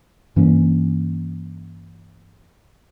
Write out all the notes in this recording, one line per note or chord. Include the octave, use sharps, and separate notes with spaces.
G2 E3 A#3 C#4